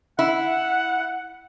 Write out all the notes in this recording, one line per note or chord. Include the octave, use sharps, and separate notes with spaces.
E4 F#5